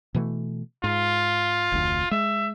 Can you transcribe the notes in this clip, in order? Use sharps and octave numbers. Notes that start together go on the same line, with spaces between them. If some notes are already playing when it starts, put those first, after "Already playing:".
B2 E3 A3
G#2 F4
F1 D2
G#3 E5